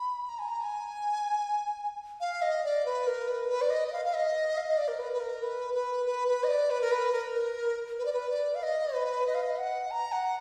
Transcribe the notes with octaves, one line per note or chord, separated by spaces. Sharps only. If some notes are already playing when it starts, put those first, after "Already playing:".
Already playing: B5
A#5
G#5
A#5
G#5
F5
D#5
D5
B4
A#4
B4
B4
D5
D#5
D#5
F5
F5
D#5
F5
D#5
D5
A#4
B4
B4
A#4
B4
B4
B4
B4
D#5
D5
B4
A#4
B4
A#4
A#4
B4
D5
B4
D5
F5
D#5
B4
D#5
F5
D#5
F#5
A#5
F#5